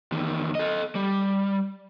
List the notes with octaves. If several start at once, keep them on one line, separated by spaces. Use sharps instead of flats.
E2 D#3
A4 D#5
G3